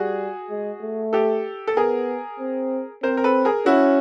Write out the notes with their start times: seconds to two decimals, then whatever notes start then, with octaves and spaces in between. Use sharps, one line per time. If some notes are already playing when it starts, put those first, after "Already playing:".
Already playing: G3 F#4 G#4
0.50 G#3
0.81 A3
1.13 G4 A4
1.67 A4
1.76 B3 G#4 A#4
2.40 C4
3.03 C4 A#4 C5
3.17 A#4
3.24 A4 B4
3.45 G#4 A#4
3.66 C#4 E4 F#4